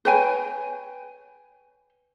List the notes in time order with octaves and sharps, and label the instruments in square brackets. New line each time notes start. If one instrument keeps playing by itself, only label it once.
[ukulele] B4 C#5 G5 G#5